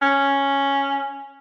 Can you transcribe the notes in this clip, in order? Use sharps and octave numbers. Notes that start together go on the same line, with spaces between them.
C#4